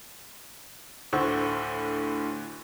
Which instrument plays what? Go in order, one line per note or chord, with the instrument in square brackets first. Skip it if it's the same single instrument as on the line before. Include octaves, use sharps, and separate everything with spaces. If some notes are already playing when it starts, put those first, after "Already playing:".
[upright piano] D2 A2 D3 C5 C#6